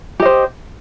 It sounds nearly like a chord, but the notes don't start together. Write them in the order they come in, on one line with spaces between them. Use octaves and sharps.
G4 D#5 C5